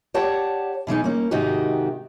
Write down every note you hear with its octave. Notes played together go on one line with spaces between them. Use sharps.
G4 C#5 D5 F#5 A5
B2 E3 G#3 D#4
A#3 C#4
G#2 C3 D#3 D#4 F#4 G4